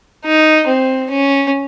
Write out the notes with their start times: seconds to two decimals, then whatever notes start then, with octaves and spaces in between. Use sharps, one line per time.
0.25 D#4
0.68 C4
1.10 C#4